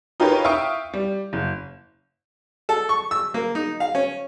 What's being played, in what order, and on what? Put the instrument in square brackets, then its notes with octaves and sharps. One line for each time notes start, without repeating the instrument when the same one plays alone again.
[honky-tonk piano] D#4 F4 G4 A#4 B4 C#5
E5 F5 G5 C#6 D#6
G3
F#1
[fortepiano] A4
C#6
E6
A#3
D#4
F5
C#4